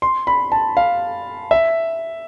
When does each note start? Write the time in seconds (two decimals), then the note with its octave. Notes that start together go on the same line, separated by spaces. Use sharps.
0.02 C6
0.27 B5
0.52 A5
0.77 F5
1.51 E5